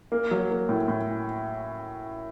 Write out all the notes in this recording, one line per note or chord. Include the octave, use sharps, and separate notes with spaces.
A#3
F#3
A#3
A2
A2